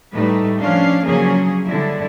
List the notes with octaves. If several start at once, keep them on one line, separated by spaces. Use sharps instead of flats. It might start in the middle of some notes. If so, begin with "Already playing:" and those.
A2 G3 A3 D#4 B4
F3 C#4 D4 F5
C#3 F3 F#3 A#3 C#4 G#4
D3 G3 D4 E4